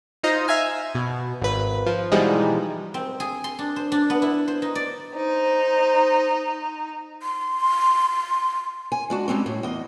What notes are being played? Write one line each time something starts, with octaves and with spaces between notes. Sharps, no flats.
D#4 F4 C5 D#5 A#5
E5 F5 G#5 F6
B2
G#1 B4
F3
B2 E3 F3 G3 G#3 D#4
C4
G#4
C6
D4
C5
D4
B3
E4
C5
D#4
D5
D#4 C5
C6
G#5
G#3 D4 F#4
G3 G#3 C4 C#4
A2
E2 D#5